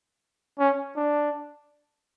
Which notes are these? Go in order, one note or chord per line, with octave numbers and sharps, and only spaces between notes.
C#4
D4